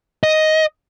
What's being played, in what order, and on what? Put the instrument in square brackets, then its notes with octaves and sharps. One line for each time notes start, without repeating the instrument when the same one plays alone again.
[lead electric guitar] D#5